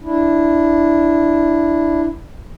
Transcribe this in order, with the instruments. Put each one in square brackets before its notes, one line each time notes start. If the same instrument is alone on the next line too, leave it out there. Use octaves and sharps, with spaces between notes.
[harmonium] D4 E4